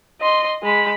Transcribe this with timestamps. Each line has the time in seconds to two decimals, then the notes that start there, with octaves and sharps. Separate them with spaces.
0.21 D#5 C6
0.63 G#3 B5